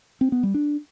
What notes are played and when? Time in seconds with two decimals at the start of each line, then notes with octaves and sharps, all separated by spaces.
0.21 C4
0.32 B3
0.43 G3
0.54 D4